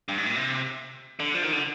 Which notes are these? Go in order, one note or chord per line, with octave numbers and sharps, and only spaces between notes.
G2
G#2
A#2
C3
D3
F3
D#3
D3